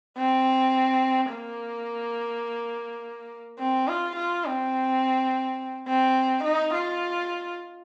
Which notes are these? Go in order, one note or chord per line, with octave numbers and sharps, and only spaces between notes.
C4
A#3
C4
F4
F4
C4
C4
D#4
F4